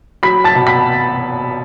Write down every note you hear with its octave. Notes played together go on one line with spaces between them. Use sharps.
F#3 B5 B6
A5 A6
B2
B5 B6